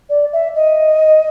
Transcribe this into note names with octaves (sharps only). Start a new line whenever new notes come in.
D5
E5
D#5